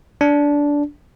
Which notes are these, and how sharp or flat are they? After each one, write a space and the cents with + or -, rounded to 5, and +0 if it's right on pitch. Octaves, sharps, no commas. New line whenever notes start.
D4 -15